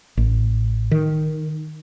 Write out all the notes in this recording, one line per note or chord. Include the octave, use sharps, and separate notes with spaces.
A1
D#3